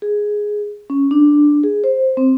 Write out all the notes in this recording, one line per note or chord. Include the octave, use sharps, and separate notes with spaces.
G#4
C#4
D4
G#4
C5
C4